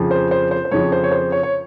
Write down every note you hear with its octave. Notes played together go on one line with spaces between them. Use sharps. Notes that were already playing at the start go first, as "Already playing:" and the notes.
Already playing: F2 C#3 F3
C5
C5
C5
C5
F2 C#3 F3 C#5
C5
C#5
C5
C#5
C#5